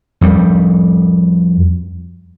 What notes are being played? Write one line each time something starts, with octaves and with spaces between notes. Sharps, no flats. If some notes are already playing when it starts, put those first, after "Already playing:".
F2 G3